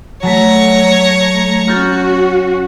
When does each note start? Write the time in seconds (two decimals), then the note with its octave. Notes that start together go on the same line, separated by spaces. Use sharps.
0.23 F#3 A3 C#5 A5 A#5 B6
1.68 C#4 F#4 F6 G6 A6